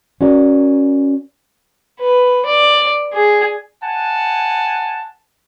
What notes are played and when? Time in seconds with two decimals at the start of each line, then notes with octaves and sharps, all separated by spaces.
0.21 C#4 F#4 A#4 D5
2.00 B4
2.46 D5
3.14 G#4
3.83 F#5 G#5 A5